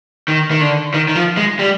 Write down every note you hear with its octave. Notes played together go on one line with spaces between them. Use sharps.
D#3
D#3
D3
D#3
D#3
F3
G#3
G3